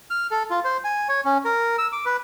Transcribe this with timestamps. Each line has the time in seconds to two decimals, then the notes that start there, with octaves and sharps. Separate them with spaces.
0.10 F6
0.31 A4
0.50 F4
0.64 C5
0.84 G#5
1.09 C#5
1.25 C#4
1.45 A#4
1.78 E6
1.92 D6
2.05 B4